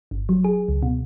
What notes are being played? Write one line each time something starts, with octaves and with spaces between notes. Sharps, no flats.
G1
F#3
G#4
C#2
B2